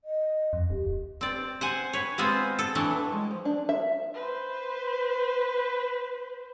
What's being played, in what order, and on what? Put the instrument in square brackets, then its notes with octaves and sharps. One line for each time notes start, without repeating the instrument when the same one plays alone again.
[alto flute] D#5
[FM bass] F2
[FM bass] D1 [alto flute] G4
[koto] C4 D5
C5 F#5 G#5
B4 C#5
G#3 B3 C4 F4 G#4 C5
A4
E3 F#3 A3 D4
[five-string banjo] G#3
F3
D4
E5
[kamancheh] B4 C5